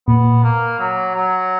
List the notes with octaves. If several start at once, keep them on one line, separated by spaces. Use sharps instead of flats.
A#2 B3
A#3
F#3
F#3